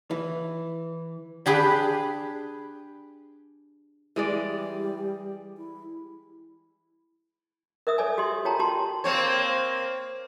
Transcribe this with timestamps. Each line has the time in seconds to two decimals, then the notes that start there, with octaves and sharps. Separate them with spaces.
0.11 E3
1.46 D4 G4 G#4 B4
4.16 E3 G3 G#3 D5
5.57 E4
7.87 A#4 D#5 E5 D#6
7.98 A4 C#5 D5 G#5
8.18 F#4 G4 D#5 C6
8.45 F4 C#5 G5 A5 A#5
8.59 F#4 G4 A5 C6
9.04 A#3 C4 C#5